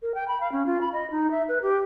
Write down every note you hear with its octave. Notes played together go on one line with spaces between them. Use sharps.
A#4
G5
B5
F5
C#4
F4
B5
D#5
D#4
E5
B4
G4